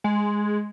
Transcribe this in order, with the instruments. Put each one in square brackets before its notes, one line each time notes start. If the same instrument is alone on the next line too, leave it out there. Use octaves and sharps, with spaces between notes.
[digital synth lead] G#3